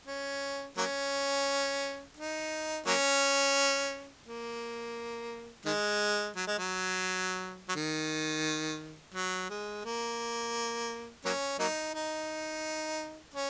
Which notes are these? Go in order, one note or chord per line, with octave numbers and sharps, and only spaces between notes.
C#4
F#3 A#3 C#4
D#4
F#3 A#3 C#4
A#3
D#3 G#3
F#3
G#3
F#3
F#3
D#3
F#3
G#3
A#3
F#3 A#3 C#4
F#3 A#3 D#4
D#4
C#4